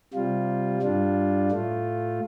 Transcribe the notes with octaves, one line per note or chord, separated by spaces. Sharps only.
C3 G3 F4
G2 G3 D4 F4
A2 A3 F4